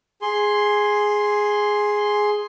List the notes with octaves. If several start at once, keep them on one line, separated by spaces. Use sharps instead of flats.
G#4 C6